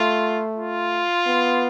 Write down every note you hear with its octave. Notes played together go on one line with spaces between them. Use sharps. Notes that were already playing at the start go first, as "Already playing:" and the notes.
Already playing: A3 F4
F4
B3